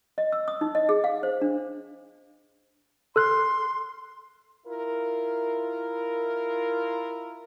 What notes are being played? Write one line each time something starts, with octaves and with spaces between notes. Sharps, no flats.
D#5
E6
D#6
D#4
D#5
G#4
F5
C5
D4
A4 C6 F6 F#6
E4 F4 A#4